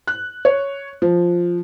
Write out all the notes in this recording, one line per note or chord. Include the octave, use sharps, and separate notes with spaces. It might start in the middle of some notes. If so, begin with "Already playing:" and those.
F#6
C#5
F3